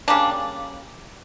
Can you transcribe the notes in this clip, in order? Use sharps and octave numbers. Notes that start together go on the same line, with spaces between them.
C#3 G3 A#3 D4